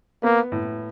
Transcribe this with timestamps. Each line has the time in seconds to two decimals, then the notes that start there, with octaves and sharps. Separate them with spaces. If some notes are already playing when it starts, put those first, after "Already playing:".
0.23 A#3 B3
0.52 A2